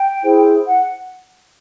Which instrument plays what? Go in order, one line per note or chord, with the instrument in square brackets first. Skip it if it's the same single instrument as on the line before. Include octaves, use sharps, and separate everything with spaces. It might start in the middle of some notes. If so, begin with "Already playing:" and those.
Already playing: [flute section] G5
E4 G#4 C5
F#5